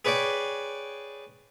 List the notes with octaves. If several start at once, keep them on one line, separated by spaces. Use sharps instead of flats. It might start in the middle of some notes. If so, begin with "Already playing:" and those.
G#4 B4 C#5 D5 G5